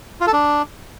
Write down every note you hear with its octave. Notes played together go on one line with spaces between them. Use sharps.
F4
A4
D4